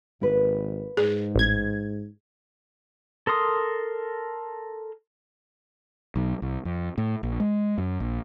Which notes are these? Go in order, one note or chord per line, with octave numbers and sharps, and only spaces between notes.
G#1 A#3 B4
G#2 G#4
A1 G#6
A4 A#4 C6 D#6
B1
C2
F2
A2
A#1
G#3
F#2
A#1